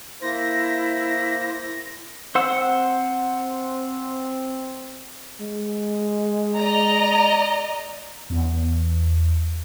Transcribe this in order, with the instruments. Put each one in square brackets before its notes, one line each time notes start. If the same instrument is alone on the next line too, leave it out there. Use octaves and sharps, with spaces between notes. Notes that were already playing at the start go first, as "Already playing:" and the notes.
[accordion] A#3 C5 [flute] E4 [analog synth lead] A#6
[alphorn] C4 [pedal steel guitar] C5 F#5 E6
[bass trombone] G#3
[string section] D5 D#5 A#5
[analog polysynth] E2